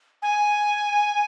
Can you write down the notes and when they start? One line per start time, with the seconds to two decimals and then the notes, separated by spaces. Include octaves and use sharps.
0.22 G#5